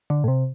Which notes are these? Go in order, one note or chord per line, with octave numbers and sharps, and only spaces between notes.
D3
A2
C3